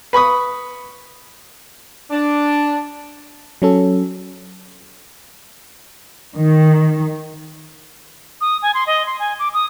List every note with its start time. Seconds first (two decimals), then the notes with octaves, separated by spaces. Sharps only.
0.13 B4 B5 C#6 D#6
2.10 D4
3.62 F#3 C#4 A4
6.36 D#3
8.41 D#6
8.62 G#5
8.74 C6
8.87 D#5
9.06 C6
9.19 G#5
9.39 D6
9.54 D#6